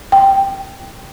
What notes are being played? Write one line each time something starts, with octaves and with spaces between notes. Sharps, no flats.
G5